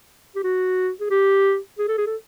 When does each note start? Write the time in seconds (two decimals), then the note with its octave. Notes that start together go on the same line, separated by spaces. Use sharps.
0.36 G4
0.43 F#4
1.00 G#4
1.10 G4
1.78 G#4
1.88 A4
1.98 G#4
2.06 A4